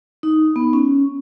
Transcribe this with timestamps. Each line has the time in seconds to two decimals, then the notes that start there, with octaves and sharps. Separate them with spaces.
0.23 D#4
0.56 B3
0.73 C#4